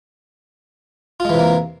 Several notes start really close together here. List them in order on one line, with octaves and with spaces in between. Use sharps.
F4 G#3 E3 C3 A#3